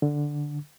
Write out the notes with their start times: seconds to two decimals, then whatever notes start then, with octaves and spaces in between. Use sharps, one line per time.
0.02 D3